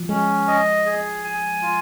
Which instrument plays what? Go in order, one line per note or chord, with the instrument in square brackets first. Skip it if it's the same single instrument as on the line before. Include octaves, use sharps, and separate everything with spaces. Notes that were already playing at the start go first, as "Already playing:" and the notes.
Already playing: [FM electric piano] F3
[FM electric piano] G#3 [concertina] C#4
[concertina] D#5
G#4
G#5
F4